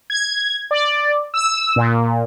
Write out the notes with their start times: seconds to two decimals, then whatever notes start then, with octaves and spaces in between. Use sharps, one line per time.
0.10 G#6
0.71 D5
1.34 E6
1.76 A#2